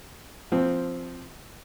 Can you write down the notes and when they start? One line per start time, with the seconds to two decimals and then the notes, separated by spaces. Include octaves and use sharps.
0.52 F3 C4